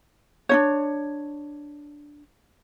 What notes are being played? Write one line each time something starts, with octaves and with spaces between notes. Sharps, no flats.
D4 D#4 C#5